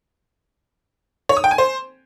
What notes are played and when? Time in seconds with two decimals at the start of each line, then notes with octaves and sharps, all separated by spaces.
1.29 C#5
1.37 D#6
1.44 G5
1.51 G#5
1.58 C5